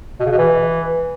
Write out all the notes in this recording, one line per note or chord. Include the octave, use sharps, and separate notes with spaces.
B2
C#3
B2
E3